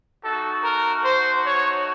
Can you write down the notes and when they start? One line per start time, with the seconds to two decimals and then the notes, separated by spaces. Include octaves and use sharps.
0.24 A3 D#4 F#4 A4
0.64 A#4
1.05 C5
1.46 C#5